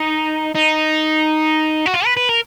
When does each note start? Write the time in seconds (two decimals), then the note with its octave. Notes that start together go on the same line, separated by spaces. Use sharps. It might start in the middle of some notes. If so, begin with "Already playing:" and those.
Already playing: D#4
0.55 D#4
1.86 F#4
1.94 F4
2.05 B4
2.17 B4
2.29 A#4